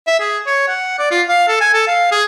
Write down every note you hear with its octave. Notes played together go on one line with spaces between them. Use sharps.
E5
G#4
C#5
F#5
D5
F4
F5
A4
G#5
A4
F5
G#4